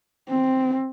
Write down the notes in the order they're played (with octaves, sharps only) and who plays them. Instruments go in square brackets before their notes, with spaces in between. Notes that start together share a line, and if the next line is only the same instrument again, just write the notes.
[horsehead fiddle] C4